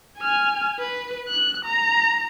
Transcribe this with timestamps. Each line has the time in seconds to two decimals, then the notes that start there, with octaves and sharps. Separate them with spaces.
0.18 G#5 F6
0.79 B4
1.28 F#6
1.65 A#5